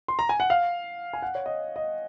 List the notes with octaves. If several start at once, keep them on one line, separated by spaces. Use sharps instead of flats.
C6
A#5
G#5
F#5
F5
G#5
F#5
C#5
D#5
D#5